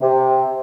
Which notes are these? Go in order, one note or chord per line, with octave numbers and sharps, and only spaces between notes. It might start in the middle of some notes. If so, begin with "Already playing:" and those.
C3